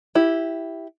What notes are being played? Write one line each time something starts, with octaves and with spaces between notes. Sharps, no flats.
E4 G4